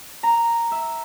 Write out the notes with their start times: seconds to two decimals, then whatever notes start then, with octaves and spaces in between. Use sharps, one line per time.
0.23 A#5
0.71 E5